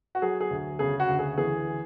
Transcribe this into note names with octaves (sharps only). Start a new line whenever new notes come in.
F#4
F#3 G#4
G#4
D2
C#3 G#4
F#4
D2
G#4
E3 G#4